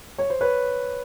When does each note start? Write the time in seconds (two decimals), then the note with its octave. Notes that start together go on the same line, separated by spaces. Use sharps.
0.18 C#5
0.30 C5
0.41 B4 C#5